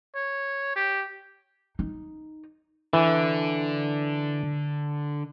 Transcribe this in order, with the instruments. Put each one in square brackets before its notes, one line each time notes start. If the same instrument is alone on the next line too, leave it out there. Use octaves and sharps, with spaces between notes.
[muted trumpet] C#5
G4
[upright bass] D#4
[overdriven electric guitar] D3 [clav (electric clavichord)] E3